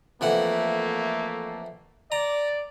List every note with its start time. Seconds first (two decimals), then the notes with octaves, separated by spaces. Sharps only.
0.21 F2 E3 A3 A#3 F#5
2.12 D5 A#5